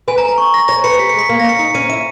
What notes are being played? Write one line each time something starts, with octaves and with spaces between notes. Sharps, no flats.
B4 G#5
A#5
A#5
C#6
A#6
C#5 A#6
B4 C#7
G4 B6
G#3 C#7
B6
A#3
C#4 A#6
C#7
D#4 C#7
C#4 D#7
E4 D#7